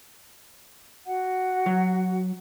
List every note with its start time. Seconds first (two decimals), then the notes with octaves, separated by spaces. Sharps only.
1.06 F#4 F#5
1.66 F#3